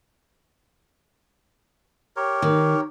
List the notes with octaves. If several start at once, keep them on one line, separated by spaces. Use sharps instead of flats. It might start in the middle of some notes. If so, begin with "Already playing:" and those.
G4 A#4 C#5
D#3